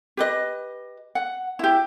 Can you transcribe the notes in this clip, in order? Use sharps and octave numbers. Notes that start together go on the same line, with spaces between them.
G4 B4 D#5
F#5
E4 G4